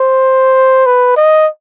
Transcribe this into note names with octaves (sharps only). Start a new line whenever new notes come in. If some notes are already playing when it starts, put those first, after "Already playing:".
Already playing: C5
B4
D#5